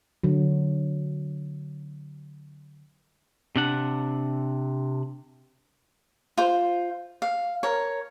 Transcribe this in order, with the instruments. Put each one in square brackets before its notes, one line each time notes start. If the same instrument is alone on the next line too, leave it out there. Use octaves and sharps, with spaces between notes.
[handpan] D3 F#3
[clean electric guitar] C3 D4 F#5
[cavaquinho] F4 C5
F5
A#4 C#5